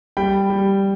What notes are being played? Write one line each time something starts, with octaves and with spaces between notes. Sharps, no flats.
G3 G5 B5
G3